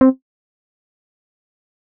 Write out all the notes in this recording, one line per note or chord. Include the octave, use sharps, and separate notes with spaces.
C4